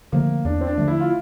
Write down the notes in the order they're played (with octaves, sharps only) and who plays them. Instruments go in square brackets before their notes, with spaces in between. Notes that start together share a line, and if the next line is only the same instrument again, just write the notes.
[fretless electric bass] D3 F3 A3 [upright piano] A#3
[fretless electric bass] E2 [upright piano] D4
[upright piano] C4
D4
[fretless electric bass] D3 F3 A3
[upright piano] E4
F4